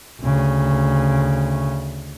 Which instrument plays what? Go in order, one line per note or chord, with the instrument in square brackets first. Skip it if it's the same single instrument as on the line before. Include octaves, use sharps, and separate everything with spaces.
[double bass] D2 C#3